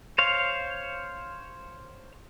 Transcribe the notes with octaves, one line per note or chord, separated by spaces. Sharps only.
C5 C#5 F5